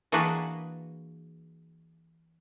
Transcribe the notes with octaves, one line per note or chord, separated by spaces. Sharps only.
E3 A#3 D4 F#4 G#4 B4